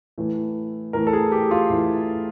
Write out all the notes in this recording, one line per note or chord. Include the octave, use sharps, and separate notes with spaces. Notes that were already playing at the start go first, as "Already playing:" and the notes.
A2 E3 A3
A2 E3 A3 A#4
A4
G#4
G4
F4
A2 E3 A3